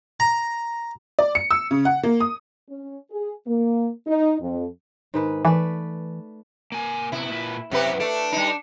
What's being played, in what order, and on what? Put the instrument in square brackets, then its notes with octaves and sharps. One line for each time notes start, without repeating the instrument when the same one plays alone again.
[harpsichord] A#5
[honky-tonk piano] D5
C#7
E6
C#3
F#5
A#3
D#6
[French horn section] C#4
G#4
A#3
D#4
F2
[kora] G#2 D#3 B4
[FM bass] E3 [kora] A3 B4 D5
[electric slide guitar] A#3 G#5
[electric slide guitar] C3 B3 [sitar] E4
[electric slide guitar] A#2 B4
[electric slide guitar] F#2 E4 F#5 [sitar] C3 G4 B4
[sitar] A3 [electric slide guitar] D4
[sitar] G3 D#4